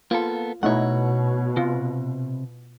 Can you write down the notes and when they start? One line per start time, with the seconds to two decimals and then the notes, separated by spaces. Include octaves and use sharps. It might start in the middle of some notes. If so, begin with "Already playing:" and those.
0.11 A#3 B3 F4 A4
0.63 B2 A3 D#4 E4 C#5 F#5
1.57 C3 F4